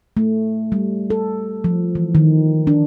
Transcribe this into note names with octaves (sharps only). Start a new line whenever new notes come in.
A3
G3
A4
F3
E3
D#3
D4